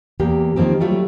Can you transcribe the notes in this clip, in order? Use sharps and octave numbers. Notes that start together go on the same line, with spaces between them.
E2 A#3 G4
D#3 F3 A#3 C4 G4
F#3 G3 A3 F4 G4